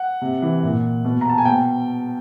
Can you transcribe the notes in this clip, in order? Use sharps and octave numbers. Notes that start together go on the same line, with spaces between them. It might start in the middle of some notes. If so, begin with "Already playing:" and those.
Already playing: F#5
C3
E3
A#2
B2
A#5
A5
G#5
B2 G5